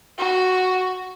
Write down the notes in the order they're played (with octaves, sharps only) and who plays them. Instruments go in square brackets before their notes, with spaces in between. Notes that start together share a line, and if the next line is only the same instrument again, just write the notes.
[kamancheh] F#4